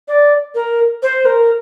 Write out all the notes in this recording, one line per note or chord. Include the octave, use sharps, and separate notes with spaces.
D5
A#4
C5
A#4